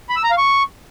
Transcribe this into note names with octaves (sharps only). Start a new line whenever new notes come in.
B5
E6
A#5
F5
C#6